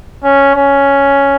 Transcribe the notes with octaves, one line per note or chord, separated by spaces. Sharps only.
C#4
C#4